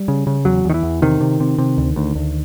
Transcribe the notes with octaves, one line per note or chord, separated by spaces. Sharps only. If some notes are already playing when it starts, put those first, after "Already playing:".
Already playing: G3
C#3
C#3
E2 F#3
E2 D#3
E3
E2
C3 D#3
C3
C3
C3
D2
D2
D2